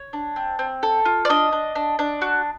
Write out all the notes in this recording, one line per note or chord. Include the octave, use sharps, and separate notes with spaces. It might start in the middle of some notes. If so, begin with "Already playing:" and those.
Already playing: C#5
D4
C4
C4
A4
F4
D5
D4 D#5
D4
D4
D4
F#4